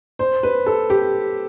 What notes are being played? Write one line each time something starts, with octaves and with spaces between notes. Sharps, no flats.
C5
B4
A4
G4